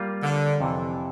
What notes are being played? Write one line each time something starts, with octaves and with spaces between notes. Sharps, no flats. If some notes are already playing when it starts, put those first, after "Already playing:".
Already playing: G3 A#3 F4
D3
F2 C3 E3